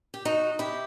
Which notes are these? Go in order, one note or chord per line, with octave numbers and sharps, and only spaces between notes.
G4
D#4 F#4
E4 G4